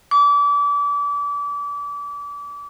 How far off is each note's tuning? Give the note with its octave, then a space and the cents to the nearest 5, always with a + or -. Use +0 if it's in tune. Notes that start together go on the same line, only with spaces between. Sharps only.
D6 -35